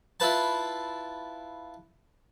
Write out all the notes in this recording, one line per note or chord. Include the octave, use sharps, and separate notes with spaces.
E4 F4 B4 A5